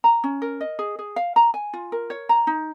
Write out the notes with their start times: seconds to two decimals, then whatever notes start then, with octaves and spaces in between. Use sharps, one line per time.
0.04 A#5
0.24 C#4
0.42 A#4
0.61 D#5
0.79 G#4
0.99 G#4
1.16 F5
1.36 A#5
1.54 G#5
1.73 F4
1.92 A#4
2.10 C#5
2.29 A#5
2.47 D#4